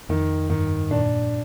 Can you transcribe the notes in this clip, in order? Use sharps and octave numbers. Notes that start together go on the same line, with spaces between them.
F2 D#3
G2 D#3
A#2 D4